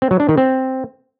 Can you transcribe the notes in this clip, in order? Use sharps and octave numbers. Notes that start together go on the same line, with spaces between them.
C4
F#3
D4
D#3
C4